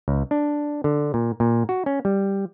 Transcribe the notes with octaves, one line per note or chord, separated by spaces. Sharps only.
C#2
D4
D3
A#2
A#2
F#4
C#4
G3